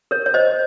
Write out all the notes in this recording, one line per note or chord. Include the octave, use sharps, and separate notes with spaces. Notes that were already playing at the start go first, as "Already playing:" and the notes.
A#4 C#5
C#5
C5 D#5